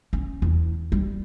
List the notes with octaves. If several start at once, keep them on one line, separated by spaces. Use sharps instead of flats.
C#4
E2
G3